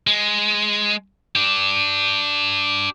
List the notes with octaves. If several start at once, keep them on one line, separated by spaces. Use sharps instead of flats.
G#3
D4 G4